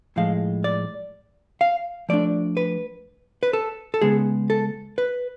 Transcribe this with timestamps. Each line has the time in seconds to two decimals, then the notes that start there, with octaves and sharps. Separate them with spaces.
0.16 A2 F3 G#3 F5
0.64 D5
1.61 F5
2.09 F3 A3 D4 D5
2.57 B4
3.43 B4
3.53 A4
3.94 A4
4.01 C#3 G#3 B3 G#4
4.50 A4
4.98 B4